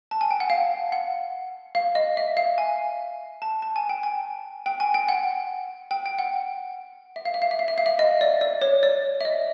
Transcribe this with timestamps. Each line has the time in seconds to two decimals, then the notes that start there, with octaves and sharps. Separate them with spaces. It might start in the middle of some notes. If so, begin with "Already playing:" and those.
0.11 A5
0.21 G#5
0.31 G5
0.40 F#5
0.50 F5
0.92 F#5
1.75 F5
1.95 D#5
2.17 E5
2.37 F5
2.58 G#5
3.42 A5
3.62 A5
3.76 G#5
3.89 G5
4.03 G#5
4.66 G5
4.80 G#5
4.94 G5
5.09 F#5
5.91 G5
6.06 G5
6.19 F#5
7.16 E5
7.25 F5
7.34 E5
7.42 F5
7.51 E5
7.59 F5
7.68 E5
7.78 F5
7.86 E5
7.99 D#5
8.21 D5
8.41 D5
8.61 C#5
8.83 D5
9.21 E5
9.25 D#5